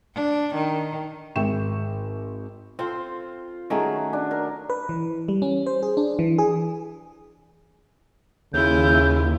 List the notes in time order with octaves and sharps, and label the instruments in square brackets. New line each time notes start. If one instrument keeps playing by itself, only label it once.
[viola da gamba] D4
D#3
[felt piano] G#1 G#3 E5 G5 C#6 E7
[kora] C4 A4 C5 [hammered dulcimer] F4
[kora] D#3 A3 G#4 [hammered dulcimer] F#3 C#4
[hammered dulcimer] D4
A#4
[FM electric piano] B4
E3
G3
C#4
C5
G#4
D4
E3
G#4
[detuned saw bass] D#2 [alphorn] C#3 [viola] E4 F4 [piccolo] G6